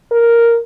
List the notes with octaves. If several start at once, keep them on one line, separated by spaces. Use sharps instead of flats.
A#4